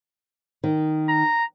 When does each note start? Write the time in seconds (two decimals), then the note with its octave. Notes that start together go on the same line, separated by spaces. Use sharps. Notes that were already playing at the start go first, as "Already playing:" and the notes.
0.64 D#3
1.09 A#5